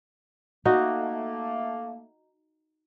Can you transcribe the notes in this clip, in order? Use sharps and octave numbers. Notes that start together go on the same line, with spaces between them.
A3 A#3 D#4 F#4